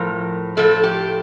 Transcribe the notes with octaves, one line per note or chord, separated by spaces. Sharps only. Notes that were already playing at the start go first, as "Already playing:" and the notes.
Already playing: A2 F3 A#4
A2 F3 A4
G4